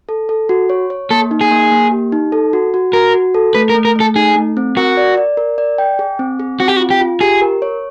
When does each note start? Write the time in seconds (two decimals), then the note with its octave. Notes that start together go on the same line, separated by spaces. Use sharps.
0.09 A4
0.29 A4
0.49 F#4
0.70 C#5
0.90 C#5
1.11 A#3 A4
1.31 D#4
1.41 G#4
1.51 A#3
1.72 A#3
1.92 G4
2.12 D#4
2.32 A4
2.53 F#4
2.74 F#4
2.93 F#4 A#4
3.14 F#4
3.35 A4
3.55 A3 B4
3.70 A#4
3.75 A3
3.85 A#4
3.96 A3 A4
4.16 D#4 G#4
4.36 A3
4.57 C4
4.77 F#4 A#4
4.97 D5
5.17 D5
5.37 A#4
5.58 D5
5.78 G5
5.99 G#4
6.19 C4
6.40 G#4
6.60 C4 F#4
6.68 G4
6.76 F#4
6.80 F4
6.90 G4
7.01 F4
7.21 G4 G#4
7.41 A#4
7.62 C#5